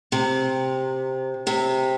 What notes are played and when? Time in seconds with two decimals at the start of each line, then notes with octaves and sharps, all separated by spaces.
0.12 C3
1.47 C3